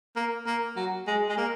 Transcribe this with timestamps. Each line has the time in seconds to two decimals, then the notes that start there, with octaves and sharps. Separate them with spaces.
0.16 A#3
0.47 A#3
0.76 F#3
1.07 G#3
1.29 G#3
1.38 A#3